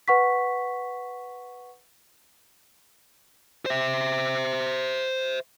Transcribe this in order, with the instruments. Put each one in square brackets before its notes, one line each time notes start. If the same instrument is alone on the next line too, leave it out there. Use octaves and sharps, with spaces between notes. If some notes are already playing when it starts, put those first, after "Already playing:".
[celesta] B4 F#5 C#6 B6
[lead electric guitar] C5 E5